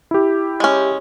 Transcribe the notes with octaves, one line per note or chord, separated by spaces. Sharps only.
E4 G4
G#3 C#4